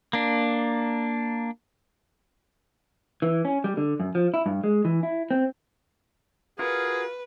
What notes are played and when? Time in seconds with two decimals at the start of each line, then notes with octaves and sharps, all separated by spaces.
0.13 A#3 D4
3.22 E3
3.45 C#4
3.64 G3
3.77 D3
4.00 F#2
4.15 F3
4.34 E4
4.46 G2
4.64 G#3
4.85 E3
5.03 E4
5.31 C4
6.59 F4 F#4 G#4 A#4 B4